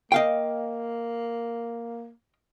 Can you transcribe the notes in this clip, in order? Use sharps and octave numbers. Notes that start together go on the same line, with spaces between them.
A#3 D#5 F5 G5